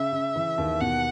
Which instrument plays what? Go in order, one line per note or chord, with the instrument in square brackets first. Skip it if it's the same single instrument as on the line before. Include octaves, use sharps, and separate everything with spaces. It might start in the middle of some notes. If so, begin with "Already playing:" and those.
Already playing: [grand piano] C#3 [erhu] E5
[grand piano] C#3
E3
D#2
[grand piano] B2 [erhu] F#5